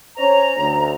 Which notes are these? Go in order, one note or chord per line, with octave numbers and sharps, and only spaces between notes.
C#4 C5 C#5 A#5
D2